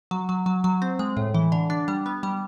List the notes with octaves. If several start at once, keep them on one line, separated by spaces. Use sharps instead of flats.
F#3
F#3
F#3
F#3
C4
G#3
A2
E3
D3
D4
G3
B3
G3